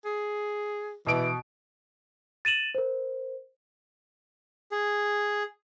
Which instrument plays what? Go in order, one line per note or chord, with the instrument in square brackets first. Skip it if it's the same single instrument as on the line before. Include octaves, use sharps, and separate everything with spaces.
[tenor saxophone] G#4
[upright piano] B2 D7 [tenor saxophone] E3
[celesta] A6 D#7 E7 F#7
A#4 C5
[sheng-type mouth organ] G#4